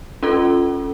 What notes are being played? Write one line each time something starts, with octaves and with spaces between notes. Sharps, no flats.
C#4 F4 A4